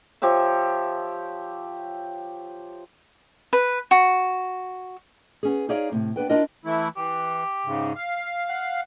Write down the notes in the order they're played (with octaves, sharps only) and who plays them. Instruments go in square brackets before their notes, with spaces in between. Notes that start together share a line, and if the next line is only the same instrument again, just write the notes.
[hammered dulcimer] F3 G4 C#5 E5
[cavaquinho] B4
F#4
[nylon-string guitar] B3 C#4 G#4
D#4 G#4 C#5 D5 E5 F5
A2 C3
B3 D4 B4 G5
D4 E4 F4 A#4 D#5
[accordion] E3 A3 E4
[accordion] E3 [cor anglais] G4
[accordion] G#2 C#3
F5
[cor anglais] F#5